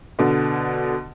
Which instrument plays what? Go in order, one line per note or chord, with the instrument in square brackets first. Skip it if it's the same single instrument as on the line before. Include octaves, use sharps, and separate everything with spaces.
[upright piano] B2 D3